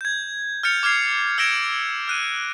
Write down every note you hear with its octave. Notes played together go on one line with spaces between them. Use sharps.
G6 G#6
F6 G6 A6 C#7 F7
D6 F6 G#6 C7 F7
E6 F6 G#6 A#6 D7 E7
F6 F#6 D#7